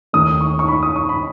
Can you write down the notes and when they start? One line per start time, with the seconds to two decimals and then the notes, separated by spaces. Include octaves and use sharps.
0.13 D#2 D#3 A3 D#6
0.41 C#6
0.59 C#6
0.68 B5
0.83 D#6
0.96 C#6
1.09 B5